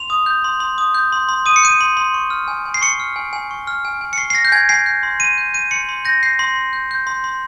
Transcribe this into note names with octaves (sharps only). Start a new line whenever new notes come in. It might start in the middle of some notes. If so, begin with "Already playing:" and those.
Already playing: C6 F7
D#6
G6
C6
C6
D#6
G6
C6
C6
D#6 D#7
C#7
G6 D#7
C6
C6
C#6
F6
G#5
G#5
C7
C#6 C#7
F6
G#5
G#5
C#6
F6
G#5
G#5
C#7
C#6 C7
C7
F6 A#6
G6
G#5 G#6
G#5 C7
G6
C6
C6 D#7
G6
G6 D#7
C6 C#7
C6
G6 A#6
G6 C7
C6
C6
G6
G6
C6
C6